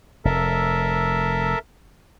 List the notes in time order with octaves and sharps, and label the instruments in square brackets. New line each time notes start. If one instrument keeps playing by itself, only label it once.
[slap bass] F1 [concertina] A4 A#4 E5